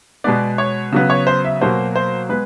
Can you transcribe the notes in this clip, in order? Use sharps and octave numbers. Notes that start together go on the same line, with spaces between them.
B2 G#3 B3 D5
C#5
C#3 F#3 B3
C#5
C5
E5
B2 F#3 A#3 C5
C5
G#3 B3 B4